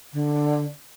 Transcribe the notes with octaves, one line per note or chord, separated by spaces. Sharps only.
D3